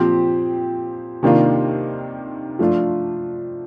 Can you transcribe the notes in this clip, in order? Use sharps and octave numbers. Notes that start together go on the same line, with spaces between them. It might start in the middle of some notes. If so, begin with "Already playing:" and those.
Already playing: A#2 F3 C4 G4 C5
C3 D#3 A#3 D4 F4
F3 A3 D4 F4